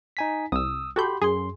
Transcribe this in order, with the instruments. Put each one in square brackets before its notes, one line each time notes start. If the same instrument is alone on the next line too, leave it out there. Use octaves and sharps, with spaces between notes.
[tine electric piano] D#4 G#5 B6
[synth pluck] C2 [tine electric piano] D#6 E6
[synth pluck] F#4 A4 G6 [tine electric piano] G4 B5 C6
[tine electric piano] F#2 C6 [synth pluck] G#4